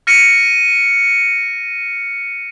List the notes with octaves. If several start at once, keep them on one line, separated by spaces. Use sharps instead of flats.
F6 A#6 C#7 D#7